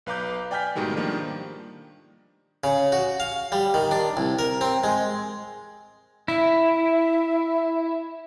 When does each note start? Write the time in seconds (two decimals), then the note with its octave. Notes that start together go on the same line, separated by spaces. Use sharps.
0.06 B1 B4 F5 A#5 D6 G6
0.51 D5 G5 G#5 F6 G6 B6
0.75 G#2 B2 D#3 G3 A3
0.97 D#3 F3 G3 A#3 D4
2.64 C#3
2.92 F#4
3.20 F5
3.52 G3
3.74 D#3
3.91 D4
4.17 C2
4.39 A#4
4.61 C4
4.84 G#3
6.28 E4 E5